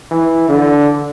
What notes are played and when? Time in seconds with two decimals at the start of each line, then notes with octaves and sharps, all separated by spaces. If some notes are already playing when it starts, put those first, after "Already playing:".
0.11 E3
0.49 D3